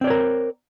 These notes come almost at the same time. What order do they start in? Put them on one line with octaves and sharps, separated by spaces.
C4 D5 C#5 A#4